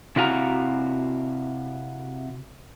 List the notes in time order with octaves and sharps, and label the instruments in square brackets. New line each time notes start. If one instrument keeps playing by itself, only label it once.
[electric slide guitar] C3 E4 F#4 F5 G#5 A#5